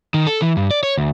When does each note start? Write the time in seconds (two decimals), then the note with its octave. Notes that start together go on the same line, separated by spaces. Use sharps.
0.14 D#3
0.27 A4
0.42 E3
0.57 G2
0.71 D5
0.83 C#5
0.97 D2